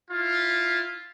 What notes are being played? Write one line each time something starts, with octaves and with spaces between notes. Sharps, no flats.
E4 F4